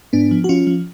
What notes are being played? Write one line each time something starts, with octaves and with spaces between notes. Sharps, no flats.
G#2 B3 D4
F3
F#4
F3 C#4 F4
F3